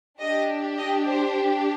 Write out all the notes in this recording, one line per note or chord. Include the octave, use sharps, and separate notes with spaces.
D4 G4 D#5
D#5
C5